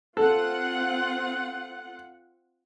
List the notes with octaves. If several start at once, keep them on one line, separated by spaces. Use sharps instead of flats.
C4 F4 A4 F#5